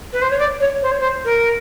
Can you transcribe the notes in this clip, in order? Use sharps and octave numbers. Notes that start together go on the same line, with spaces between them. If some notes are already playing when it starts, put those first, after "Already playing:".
B4
C5
C#5
D5
C#5
C5
C#5
C5
A#4